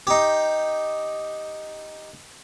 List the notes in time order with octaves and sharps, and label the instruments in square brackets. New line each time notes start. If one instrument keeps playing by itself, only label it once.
[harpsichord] D#4 G4